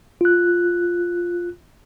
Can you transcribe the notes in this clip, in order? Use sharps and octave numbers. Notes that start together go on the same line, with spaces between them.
F4 F#6